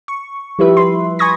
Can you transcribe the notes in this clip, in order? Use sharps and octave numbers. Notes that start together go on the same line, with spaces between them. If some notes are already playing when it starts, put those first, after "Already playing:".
C#6
F3 G3 E4 G4 B4 E5
B4 C6
G#5 B5 C#6 D#6 G#6 A#6